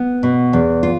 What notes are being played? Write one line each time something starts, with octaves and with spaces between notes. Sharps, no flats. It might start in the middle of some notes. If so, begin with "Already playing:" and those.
Already playing: B3
B2
E2
F4